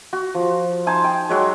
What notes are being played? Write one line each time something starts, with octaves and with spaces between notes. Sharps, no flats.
F#4
F3
D#4 C5 G#5 A5
G5
F#3 G#3 C#5